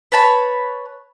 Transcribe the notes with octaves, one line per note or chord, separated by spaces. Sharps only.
B4 C#5 A5 B5